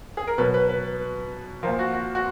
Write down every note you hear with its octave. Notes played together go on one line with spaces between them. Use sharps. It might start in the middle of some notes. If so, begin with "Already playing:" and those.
G#4
A#4
B2 F#3 B4
B4
B4
A#2 F3 A#4
F#4
F#4
F#4